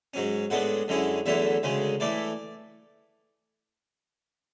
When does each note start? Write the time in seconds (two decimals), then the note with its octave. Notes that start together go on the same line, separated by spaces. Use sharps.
0.14 G#2 F#3 C#4
0.50 A2 G#3 B3 D4 F#5
0.88 F#2 D3 G#3 C#4 E4
1.26 E2 D3 F#3 A3 E4 E5
1.63 D2 C#3 G#3 C#4
2.00 A2 E3 A3 E4 D5